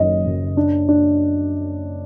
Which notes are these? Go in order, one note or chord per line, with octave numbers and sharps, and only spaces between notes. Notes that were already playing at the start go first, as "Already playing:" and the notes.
Already playing: F#1 F#2 D#3 D#5
F#2
D4
D4